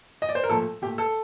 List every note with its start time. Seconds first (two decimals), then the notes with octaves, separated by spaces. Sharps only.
0.22 D#5
0.29 D5
0.35 C5
0.43 A#4
0.49 A#2 F3 A3 A4
0.82 A#2 A3 G4
0.98 A4